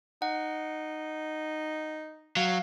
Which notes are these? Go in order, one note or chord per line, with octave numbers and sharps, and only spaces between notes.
D#4 F#5
F#3 F5